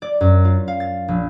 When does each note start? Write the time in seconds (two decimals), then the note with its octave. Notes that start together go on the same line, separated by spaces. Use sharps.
0.02 D5
0.21 F#2
0.45 F4
0.68 F5
0.80 A6
1.08 A#1